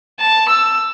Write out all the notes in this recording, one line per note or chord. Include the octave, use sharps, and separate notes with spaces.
A5
E6